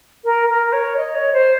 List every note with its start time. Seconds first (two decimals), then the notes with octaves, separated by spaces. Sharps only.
0.24 A#4
0.49 A#4
0.72 C#5
0.97 D#5
1.15 C#5
1.33 C5